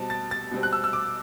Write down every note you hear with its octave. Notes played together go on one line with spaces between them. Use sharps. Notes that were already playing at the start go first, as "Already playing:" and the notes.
Already playing: B2 G3 C4 A5
A6
A6
B2 G3 C4
F#6
E6
E6
D6